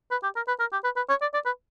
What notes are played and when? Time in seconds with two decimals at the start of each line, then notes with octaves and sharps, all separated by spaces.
0.11 B4
0.23 G4
0.36 A#4
0.48 B4
0.59 A#4
0.72 G4
0.84 B4
0.96 B4
1.09 C#5
1.21 D5
1.33 D5
1.45 B4